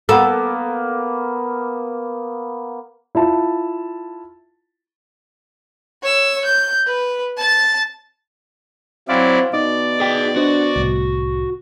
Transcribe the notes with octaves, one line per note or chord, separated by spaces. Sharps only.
A#3 B3 A4
E4 F4 A5
C#5 E6
G6
B4
A5 A6
F#3 C4 E4 D5 F5 C6
B2 D#4 D5 D#5
G#4 G5
D4 F#4 C5 D#5
C2 A2